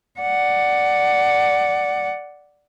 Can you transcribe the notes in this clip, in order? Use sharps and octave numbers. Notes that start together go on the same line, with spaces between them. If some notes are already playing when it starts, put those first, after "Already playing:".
D5 F#5